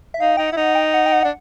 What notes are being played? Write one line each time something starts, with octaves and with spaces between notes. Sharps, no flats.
E5
D#4 F5
D#4 G5
E4 F#5
D#4
G5
F#5
G5
F#5
D4 F#5